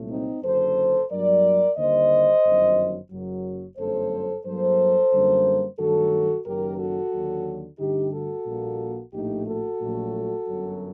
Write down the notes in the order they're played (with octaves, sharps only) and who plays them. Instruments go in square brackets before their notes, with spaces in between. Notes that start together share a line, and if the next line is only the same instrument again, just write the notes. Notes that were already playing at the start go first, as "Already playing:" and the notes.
Already playing: [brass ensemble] C2 A#2 F#3 A3
C4 D#4
F#1 F#2 D3 A4 C5
G2 F#3 A#3 A#4 D5
D#2 D3 G3 A#3 C5 D#5
G1 F#2 D#3 F#3
F#1 F#2 F#3
G1 F#2 F#3 A3 A4 C5
G2 F#3 A#3 A4 C5
F#2 D3 G3 A#3
G2 D#3 F#3 A3 F#4 A4
F#1 F#2 D#3 F#3 G4 A#4
F#4 A4
D#2 D3 F#3
G2 D3 A3 D#4 G4
F#4 A4
A#1 A#2 G3 A#3
A#1 A2 A3 D#4 G4
F#4 A4
A#1 A#2 F#3 A3
G1 F#2 F#3